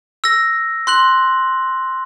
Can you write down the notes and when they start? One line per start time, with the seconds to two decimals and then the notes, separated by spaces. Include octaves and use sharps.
0.24 E6 A#6
0.87 C6 F#6 F#7